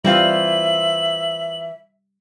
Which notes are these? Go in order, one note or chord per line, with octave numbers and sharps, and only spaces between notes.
E3 G3 C4 F4 E5 F#7